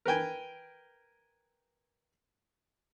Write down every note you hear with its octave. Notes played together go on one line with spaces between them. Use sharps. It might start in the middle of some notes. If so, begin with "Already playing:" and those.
A#4 B4 G5 G#5